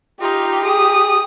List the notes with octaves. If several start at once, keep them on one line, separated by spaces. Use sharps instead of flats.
D#4 F4 G4
G#4 D#6